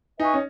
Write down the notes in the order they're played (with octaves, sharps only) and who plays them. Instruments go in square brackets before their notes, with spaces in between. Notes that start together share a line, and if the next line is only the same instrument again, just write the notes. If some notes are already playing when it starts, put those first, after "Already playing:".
[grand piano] D#4 [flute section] B4 E5 G#5 C#6
[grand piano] C#4